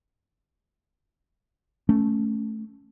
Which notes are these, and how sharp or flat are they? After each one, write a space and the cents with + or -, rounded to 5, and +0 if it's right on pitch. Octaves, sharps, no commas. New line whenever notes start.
A3 -10 C#4 +0